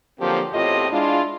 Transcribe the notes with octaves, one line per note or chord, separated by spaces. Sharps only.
D3 F3 F#3 A#3 C4 G4
E2 A2 C4 F4 G4 D#5
G#3 D4 E4 F4